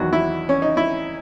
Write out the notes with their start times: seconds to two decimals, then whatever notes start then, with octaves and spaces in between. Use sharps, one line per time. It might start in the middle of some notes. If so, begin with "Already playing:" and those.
Already playing: E2 D#3 F#3 F#4
0.13 E4
0.49 C#4
0.62 D#4
0.77 E4